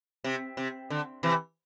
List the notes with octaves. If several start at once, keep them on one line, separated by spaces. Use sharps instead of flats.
C3
C3
D3
C3 E3